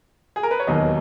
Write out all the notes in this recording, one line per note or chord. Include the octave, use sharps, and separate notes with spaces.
G#4
A#4
B4
C#5
E1 D#2 D#3 F#3 D#5